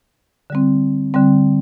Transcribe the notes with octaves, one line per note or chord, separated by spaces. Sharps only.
D3 G3 C4
D3 G3 C4